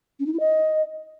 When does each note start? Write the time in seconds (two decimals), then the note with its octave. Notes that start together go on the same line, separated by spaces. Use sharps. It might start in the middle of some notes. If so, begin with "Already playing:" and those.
0.20 C#4
0.26 D#4
0.33 E4
0.40 D#5